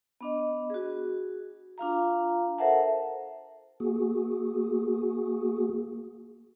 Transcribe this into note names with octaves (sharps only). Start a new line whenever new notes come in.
B3 D4 D#5
F#4 G#4
D4 F4 F5 A#5
A4 A#4 C5 E5 F#5 A5
A#3 F#4 G#4